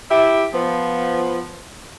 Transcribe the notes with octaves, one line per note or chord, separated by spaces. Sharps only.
E4 G4 E5
F3 B3